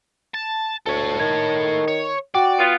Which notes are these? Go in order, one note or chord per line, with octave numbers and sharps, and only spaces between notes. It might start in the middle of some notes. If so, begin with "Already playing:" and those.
A5
D2 A4 C#5
D#3 G#6
C#5
F#4 D5 G5
B3 F4